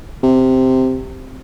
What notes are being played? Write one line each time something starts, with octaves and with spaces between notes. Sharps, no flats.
C3